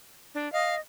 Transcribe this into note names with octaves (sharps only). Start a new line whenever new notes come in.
D4
D#5 F5